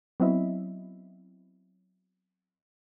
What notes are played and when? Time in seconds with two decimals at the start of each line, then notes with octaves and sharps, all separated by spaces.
0.20 F#3 B3 C4 E4 D#5 E5